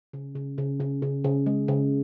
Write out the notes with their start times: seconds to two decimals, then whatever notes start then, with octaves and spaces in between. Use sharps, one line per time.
0.13 C#3
0.35 C#3
0.58 C#3
0.80 C#3
1.02 C#3
1.24 C#3
1.46 G#3
1.68 C#3